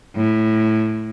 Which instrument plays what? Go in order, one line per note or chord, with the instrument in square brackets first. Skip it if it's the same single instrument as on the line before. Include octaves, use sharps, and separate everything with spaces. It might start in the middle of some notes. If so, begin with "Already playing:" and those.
[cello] A2